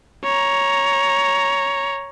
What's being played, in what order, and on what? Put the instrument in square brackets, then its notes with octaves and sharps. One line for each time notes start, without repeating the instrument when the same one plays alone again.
[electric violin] C#5 A#5